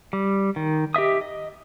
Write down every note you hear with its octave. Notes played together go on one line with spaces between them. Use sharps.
G3
D#3
G4 D#5 E5 D#6
D#5